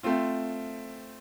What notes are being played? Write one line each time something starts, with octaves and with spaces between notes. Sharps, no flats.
A3 C4 F4